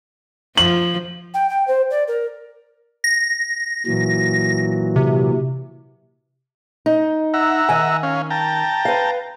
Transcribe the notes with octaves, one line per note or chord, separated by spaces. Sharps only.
F3 F#7
G5
G5
C5
D5
A#4
A#6
A#2 E3 F#3
C3
D#4
E5 F#5 A#5
D#3 G#5
C#4 F5
G5 A5 A#5
B4 F5